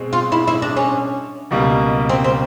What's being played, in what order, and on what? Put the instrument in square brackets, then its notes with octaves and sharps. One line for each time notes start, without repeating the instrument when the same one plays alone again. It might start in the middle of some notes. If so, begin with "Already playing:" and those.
Already playing: [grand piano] B2 G#3 C4
[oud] F4
E4
E4
D4
C#4
[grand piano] C#2 B2 G3 A#3
[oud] C4
C4